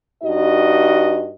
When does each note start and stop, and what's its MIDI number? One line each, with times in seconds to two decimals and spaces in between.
0.24 1.32 43
0.24 1.32 63
0.24 1.32 66
0.24 1.32 75